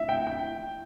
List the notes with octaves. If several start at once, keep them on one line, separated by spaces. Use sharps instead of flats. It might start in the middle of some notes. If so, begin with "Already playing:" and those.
Already playing: E5
G5
G5